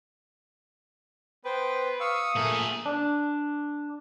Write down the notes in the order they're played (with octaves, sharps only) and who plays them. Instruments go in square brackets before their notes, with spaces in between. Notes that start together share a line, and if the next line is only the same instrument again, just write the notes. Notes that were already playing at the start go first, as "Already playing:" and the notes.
[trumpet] B3 [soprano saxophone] B4 [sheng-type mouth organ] C5 G5
[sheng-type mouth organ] F5 C#6 E6 [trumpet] D#6
[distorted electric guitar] A#2 G#4 [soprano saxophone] A3 [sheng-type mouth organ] A#4
[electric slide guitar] D4